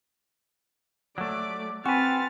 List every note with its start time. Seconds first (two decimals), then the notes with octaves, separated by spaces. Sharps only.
1.18 F#3 A3 D5 D6
1.86 C4 F#4 B4 G#5 F6 A6